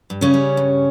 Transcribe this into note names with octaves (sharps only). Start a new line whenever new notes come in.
G2
C#3 C#4
G3
G2